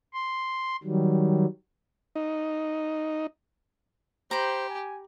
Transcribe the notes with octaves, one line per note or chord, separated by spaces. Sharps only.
C6
D#3 F#3 G3
D#4
G4 C5 A#5 B5
G#5